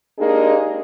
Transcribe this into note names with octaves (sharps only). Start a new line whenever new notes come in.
G#3 A#3 D4 D#4 G4 G#4